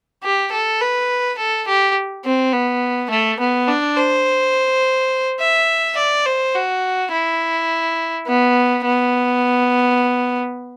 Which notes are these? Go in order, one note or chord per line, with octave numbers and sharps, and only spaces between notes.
G4
A4
B4
A4
G4
C4
B3
A3
B3
D4
C5
E5
D5
C5
F#4
E4
B3
B3